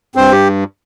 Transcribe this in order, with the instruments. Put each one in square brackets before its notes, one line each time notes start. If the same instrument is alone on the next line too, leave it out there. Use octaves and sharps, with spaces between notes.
[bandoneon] G2 C4 C5
G4